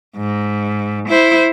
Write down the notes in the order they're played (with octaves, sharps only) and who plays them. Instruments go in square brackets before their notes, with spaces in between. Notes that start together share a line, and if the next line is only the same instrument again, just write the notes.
[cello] G#2
E4 C5